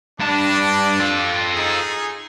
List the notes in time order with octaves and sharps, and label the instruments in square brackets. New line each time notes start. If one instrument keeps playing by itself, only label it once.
[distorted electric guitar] G2 A5 [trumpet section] D4
[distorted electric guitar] F4 A4
[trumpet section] D#4 G#4